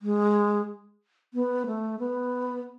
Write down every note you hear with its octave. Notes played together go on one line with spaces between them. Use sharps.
G#3
B3
A3
B3